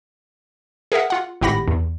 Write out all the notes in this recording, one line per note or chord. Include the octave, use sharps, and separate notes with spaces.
G#4 A#4 E5 F#5
F4 F#5
G#1 A2 G4 F#5 B5 A#6
E2